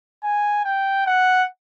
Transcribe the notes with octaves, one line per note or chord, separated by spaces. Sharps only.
G#5
G5
F#5